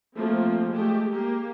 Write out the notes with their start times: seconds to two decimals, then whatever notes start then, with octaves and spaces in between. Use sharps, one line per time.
0.16 F3 A3 A#3 C4
0.69 G#3 A3 G4
1.10 A#3 G4